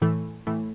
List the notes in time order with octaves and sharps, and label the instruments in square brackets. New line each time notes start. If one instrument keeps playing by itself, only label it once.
[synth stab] A2 E3 A3
A2 E3 A3